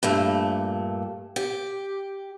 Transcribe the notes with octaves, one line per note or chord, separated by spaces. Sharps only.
G2 A#2 A3
G4